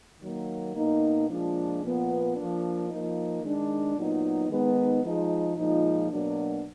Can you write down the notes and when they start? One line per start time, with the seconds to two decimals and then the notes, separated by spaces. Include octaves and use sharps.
0.21 D#3 F#3 A#3
0.75 B2 A#3 D#4
1.29 A#2 F3 G#3 D4
1.83 A#2 F3 B3
2.36 F3 A#3 D4
2.89 F3 A#3 D#4
3.42 D#3 G#3 D4
3.95 A#2 F#3 B3 D#4
4.49 D#3 G#3 B3 D#4
5.03 F3 G#3 D#4
5.56 A#2 F3 G#3 D#4
6.10 B2 F#3 A#3 D4